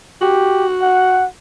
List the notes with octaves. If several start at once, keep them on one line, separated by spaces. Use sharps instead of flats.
F#4 G4
F#5